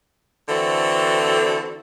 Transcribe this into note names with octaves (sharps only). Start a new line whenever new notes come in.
D3 E3 C4 F#4 A4